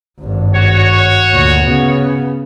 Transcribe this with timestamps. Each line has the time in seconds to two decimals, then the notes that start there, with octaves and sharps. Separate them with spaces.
0.21 G#1 G2
0.54 F#4 C#5
1.33 D2 A#2
1.67 C#3 B3